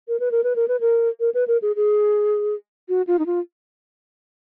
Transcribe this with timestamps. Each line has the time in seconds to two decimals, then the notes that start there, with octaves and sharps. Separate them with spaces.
0.08 A#4
0.20 B4
0.31 A#4
0.44 B4
0.56 A#4
0.68 B4
0.80 A#4
1.20 A#4
1.34 B4
1.48 A#4
1.62 G#4
1.76 G#4
2.89 F#4
3.07 F4
3.19 D#4
3.26 F4